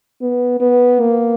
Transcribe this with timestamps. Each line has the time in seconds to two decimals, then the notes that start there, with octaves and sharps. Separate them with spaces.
0.22 B3
0.61 B3
1.00 A#3